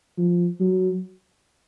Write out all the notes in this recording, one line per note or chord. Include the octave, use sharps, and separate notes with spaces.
F3
F#3